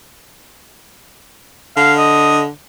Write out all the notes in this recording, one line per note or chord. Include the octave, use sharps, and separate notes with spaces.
D3 F5
D#5